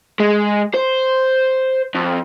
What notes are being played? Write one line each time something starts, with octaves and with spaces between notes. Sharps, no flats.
G#3
C5
F2